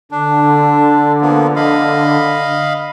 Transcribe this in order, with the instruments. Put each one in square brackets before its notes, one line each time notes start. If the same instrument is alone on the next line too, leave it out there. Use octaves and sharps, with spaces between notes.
[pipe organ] D3 [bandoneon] D4
[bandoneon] F3 A#3 B3
D#5 F5 B5